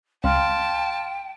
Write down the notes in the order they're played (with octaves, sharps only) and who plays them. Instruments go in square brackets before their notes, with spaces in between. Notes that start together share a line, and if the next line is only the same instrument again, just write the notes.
[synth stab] C#2 [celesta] F5 C6 F6 [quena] G5 [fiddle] A5